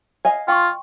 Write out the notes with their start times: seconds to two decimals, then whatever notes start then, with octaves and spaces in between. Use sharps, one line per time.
0.25 D#5 F5 G#5
0.48 F4 G5 C6 C#6